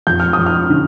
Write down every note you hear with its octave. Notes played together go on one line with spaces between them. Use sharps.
F2 G6
F6
D#6
F2
F6
D3